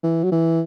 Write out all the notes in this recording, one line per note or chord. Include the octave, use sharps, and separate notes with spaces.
E3
F#3
E3